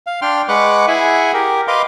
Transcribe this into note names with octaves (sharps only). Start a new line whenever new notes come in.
F5
D4 G5 C6 F6
G#3 B4 F#5 C#6 D6 F#6
E4 G#4 E5 F#5 G#5
G4 A#4
B4 D#5 F5 C6 D6